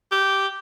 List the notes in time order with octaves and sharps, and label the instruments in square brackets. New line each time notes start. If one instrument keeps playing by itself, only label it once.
[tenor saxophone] G4